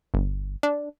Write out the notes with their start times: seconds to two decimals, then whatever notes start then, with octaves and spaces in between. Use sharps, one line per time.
0.14 G1
0.63 D4